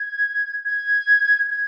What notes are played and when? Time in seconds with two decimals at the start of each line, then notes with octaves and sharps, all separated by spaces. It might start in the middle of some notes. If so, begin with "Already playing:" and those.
Already playing: G#6
0.64 G#6
1.50 G#6